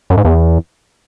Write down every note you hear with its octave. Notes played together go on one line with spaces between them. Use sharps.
F#2
G#2
E2